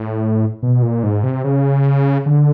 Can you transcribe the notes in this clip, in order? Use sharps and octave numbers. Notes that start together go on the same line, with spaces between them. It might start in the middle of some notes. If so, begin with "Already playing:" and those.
Already playing: A2
B2
A#2
G#2
C3
C#3
D3